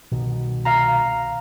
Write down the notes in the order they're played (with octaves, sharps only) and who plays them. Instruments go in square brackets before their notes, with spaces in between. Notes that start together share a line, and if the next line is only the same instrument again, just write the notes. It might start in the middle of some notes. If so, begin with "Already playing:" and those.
[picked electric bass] C2 B2 D#3
[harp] F5 A#5